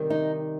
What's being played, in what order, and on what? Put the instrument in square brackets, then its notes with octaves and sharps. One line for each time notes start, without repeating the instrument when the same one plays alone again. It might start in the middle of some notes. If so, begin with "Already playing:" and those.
Already playing: [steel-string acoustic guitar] C3 D#3 G3
D#4